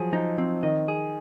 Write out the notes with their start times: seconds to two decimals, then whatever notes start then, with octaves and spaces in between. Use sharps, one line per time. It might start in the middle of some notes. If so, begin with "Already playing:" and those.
Already playing: F3 F#3 G#4
0.13 F3 D#4
0.38 F3 C4
0.63 D#3 D#5
0.88 G#4